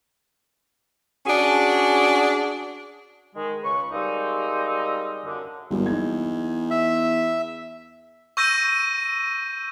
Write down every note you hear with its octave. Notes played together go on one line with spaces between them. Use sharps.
C#4 D4 F#4 G#4
D#3 G#3
C#2 C#3 B4 C#6
G3 G#3 A#3 C4 D#4
F#2 D3
G1 E2 F#3 A#3
D#4 G#6
E5
C#6 E6 G6 A#6 D#7